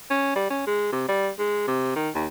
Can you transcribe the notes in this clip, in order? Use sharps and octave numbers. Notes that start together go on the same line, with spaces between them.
C#4
G3
C#4
G#3
C3
G3
G#3
C3
D#3
D#2